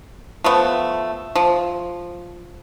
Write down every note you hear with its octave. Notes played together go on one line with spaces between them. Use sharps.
F3 A3 B3
F3